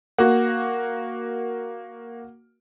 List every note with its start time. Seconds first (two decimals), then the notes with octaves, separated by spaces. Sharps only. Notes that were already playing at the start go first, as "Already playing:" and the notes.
0.18 A#3 F#4 F#5